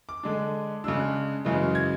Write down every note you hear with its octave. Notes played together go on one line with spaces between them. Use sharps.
D6
D3 G#3 D4
C#3 G#3 D4 E6
F#6
F#2 C#3 E3 G#3
G#6